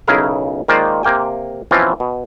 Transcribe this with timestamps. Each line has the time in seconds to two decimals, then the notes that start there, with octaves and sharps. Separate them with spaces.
0.08 B1 C#3 E4 G#4 A#4 F5
0.68 D#3 G#3 A#3 F4 C5 D5
1.03 C3 A#3 G5 G#5
1.71 B2 E3 F3 C4 C#4 F4
2.00 B2